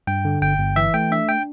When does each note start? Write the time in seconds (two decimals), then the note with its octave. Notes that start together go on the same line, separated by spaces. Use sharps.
0.07 G2 G5
0.25 D3
0.42 G1 G5
0.59 G1
0.76 E3 E5
0.94 A3 G5
1.11 D4 E5
1.29 G5